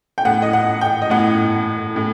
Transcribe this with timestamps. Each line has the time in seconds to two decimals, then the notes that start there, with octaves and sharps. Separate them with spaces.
0.18 G5
0.25 A2 F#5
0.42 D#5
0.53 F#5
0.81 G5
1.02 D#5
1.10 A2 F#5
1.96 A2